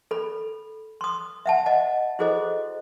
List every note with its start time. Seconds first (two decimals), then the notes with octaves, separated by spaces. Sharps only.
0.11 A4 B5
1.01 C6 D#6
1.46 E5 F#5 A5
1.66 D#5 F#5 A5
2.19 E4 F#4 G#4 A4 C5 D#5